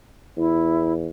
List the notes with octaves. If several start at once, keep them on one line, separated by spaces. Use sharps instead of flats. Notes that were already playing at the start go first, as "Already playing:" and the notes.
E2 E4